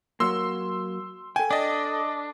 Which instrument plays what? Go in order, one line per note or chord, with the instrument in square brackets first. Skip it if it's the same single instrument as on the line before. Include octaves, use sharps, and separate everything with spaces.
[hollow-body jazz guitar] F#3 A#3 [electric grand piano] C6 E6
[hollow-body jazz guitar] A4 G5 [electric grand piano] G#5
[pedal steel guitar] D4 [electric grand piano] D5 D#5